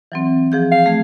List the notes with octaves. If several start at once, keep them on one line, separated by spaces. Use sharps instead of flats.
E3 F#3 C4
F3 G#4 G6
F5
A3 G#6